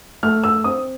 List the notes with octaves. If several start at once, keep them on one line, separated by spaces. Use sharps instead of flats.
A3 F6
E6
C4 D#6